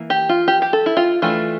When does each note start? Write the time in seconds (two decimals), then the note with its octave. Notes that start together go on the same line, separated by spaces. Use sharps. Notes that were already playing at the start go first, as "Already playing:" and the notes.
Already playing: E3 A#3
0.10 G4
0.29 F4
0.48 G4
0.62 G4
0.73 A4
0.86 E4
0.97 F4
1.22 E3 A3 D4 F4